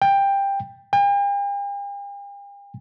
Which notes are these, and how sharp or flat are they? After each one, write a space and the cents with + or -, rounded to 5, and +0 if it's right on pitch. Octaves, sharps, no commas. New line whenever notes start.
G5 +15
G5 +45